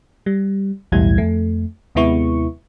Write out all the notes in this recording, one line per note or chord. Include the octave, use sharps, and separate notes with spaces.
G3
B1 E2 A2 G3 E4 G#6
F2 A3
D#2 C3 G#3 B3 E4 C#6